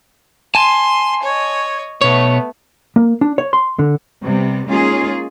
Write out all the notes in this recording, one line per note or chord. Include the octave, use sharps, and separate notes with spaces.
G#5 A5 C6
C#5 D#5
B2 A3 B3 C#5
A#3
D4
C#5
C6
D3
C3 G3 B3
G#3 A#3 C#4 D#4 F4 G#4